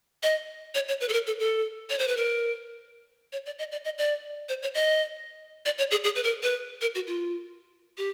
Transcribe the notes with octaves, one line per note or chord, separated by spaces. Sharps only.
D#5
C#5
C#5
B4
A4
A#4
A4
A4
C#5
C5
B4
A#4
C#5
D5
D#5
D5
D#5
D5
C5
C#5
D#5
D5
C#5
G#4
G#4
B4
A#4
B4
A#4
F#4
F4
G4